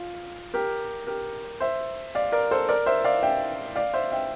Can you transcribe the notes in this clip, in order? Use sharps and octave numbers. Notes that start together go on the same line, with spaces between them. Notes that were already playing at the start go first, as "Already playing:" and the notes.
Already playing: F4
G4 A#4
G4 A#4
C5 E5
D5 F5
A#4 D5
A4 C5
A#4 D5
C5 E5
D5 F5
E5 G5
D5 F5
C5 E5
E5 G5